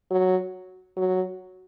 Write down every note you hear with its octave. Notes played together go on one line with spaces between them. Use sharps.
F#3
F#3